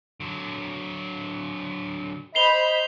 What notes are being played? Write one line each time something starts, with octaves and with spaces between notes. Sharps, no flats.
D3 F#3
C5 D#5 B5 C7 F7 G7